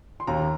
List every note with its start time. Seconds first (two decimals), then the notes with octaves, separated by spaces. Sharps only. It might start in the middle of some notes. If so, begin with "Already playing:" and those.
0.20 C6
0.27 D#2 A#5